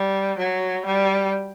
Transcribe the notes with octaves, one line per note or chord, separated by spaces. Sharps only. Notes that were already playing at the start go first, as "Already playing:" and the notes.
Already playing: G3
F#3
G3